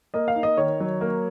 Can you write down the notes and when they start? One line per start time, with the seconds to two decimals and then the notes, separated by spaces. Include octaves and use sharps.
0.14 A#3 D#5
0.28 F5
0.36 D#4
0.43 D#5
0.57 D#3 C#5
0.80 F#3
1.01 A#3